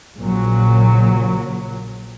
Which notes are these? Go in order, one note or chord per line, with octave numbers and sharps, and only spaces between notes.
A#1 A#2 C#3 F#3